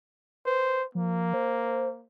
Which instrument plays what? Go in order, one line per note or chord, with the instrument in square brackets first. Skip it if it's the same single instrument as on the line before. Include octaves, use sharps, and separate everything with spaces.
[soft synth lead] B4 [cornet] C5
[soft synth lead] F3 [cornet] A#3
[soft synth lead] C5